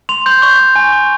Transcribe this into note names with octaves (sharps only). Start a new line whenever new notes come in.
C6 F7
C6 G6
C#6 G6
C#6
G#5
C#6